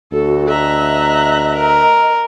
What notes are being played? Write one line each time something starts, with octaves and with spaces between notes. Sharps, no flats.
D2 F#4 A4
D#5 E5 A#5 F#6
A#4